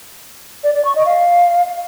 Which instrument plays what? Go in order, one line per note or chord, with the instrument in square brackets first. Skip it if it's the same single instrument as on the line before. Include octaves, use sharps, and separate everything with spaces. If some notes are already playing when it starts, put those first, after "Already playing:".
[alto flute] D5
D5
C#6
D#5
F5